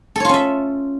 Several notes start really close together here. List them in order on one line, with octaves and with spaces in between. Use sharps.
A4 C#5 F4 C#4 E5